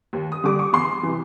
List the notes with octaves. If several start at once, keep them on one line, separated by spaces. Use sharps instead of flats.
D#2
D#6
D3 G3 D6
C#6
E2 C6
C3 E3